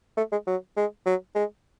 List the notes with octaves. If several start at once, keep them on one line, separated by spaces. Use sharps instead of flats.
A3
G#3
F#3
G#3
F#3
G#3